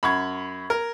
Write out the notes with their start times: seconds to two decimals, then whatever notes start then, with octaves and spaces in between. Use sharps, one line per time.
0.03 F#2 B5 C#6 G#6
0.70 A#4